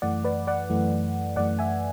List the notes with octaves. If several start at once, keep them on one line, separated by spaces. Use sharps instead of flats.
F#2 E3 A3 D5 F#5
B4 D5
D5 F#5
F#2 E3 A3
F#2 E3 A3 D5 F#5
E5 G#5